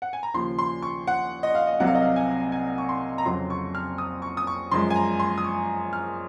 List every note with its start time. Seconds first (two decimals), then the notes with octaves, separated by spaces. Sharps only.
0.02 F#5
0.13 G#5
0.23 A#5
0.34 D#2 C#3 F3 C6
0.59 C6
0.82 C#6
1.07 F#5
1.43 D#5
1.55 F5
1.67 D#5
1.80 C2 C3 F#3 F#5
1.87 F5
1.95 D#5
2.02 F5
2.16 G#5
2.52 G#5
2.78 C#6
2.89 C6
3.18 A#5
3.25 F2 C#3 F#3 C6
3.50 C#6
3.75 F6
3.98 D#6
4.22 C#6
4.37 D#6
4.47 C#6
4.71 F#2 F3 G#3 C6
4.90 G#5
4.96 A#5
5.20 C6
5.38 D#6
5.44 C#6
5.93 F6